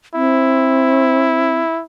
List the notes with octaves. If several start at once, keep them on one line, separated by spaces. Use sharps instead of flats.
C4 E4